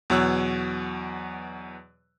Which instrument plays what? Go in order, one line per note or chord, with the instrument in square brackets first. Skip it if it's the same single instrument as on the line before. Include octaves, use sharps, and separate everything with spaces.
[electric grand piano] E2 B2 F#3 C#5 E6 F#6